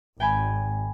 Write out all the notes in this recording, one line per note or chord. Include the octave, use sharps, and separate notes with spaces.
G#1 G5 G#5 B5